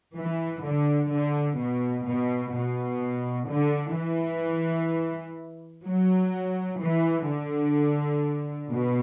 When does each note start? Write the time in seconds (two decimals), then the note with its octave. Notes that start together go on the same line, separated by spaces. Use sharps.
0.17 E3
0.65 D3
1.12 D3
1.59 B2
2.07 B2
2.54 B2
3.49 D3
3.96 E3
5.86 F#3
6.81 E3
7.29 D3
8.71 B2